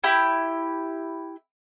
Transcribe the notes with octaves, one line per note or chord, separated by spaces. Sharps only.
E4 G4